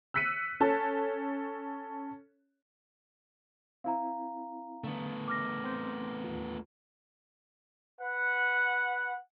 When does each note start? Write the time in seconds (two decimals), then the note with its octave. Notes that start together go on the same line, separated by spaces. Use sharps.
0.14 E6 F#6 B6 C#7 D#7
0.60 C#4 A4 C#5 A5
3.84 C4 E4 F5 A#5
4.84 D3 A3 B3
5.28 D6 F6 A#6
5.64 C4 C6 G6
6.24 D#2 F4
8.01 B4 F#5